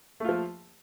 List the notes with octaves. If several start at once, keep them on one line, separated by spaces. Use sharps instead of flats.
F3 A3 F4